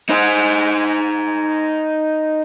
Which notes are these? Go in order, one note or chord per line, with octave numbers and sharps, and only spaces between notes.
D#4 C5